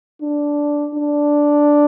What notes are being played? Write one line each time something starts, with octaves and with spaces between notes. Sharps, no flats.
D4
D4